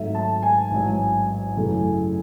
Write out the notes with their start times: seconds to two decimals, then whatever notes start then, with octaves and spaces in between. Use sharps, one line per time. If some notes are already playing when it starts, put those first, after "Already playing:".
Already playing: G#1 G#2 F#3 A3 E5
0.15 A5
0.43 G#5
0.71 A1 G#2 F#3
1.57 F#2 C#3 E3 A3